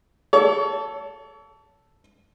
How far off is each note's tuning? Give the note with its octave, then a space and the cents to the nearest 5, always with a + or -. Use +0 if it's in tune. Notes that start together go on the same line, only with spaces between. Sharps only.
A4 +0 C#5 +40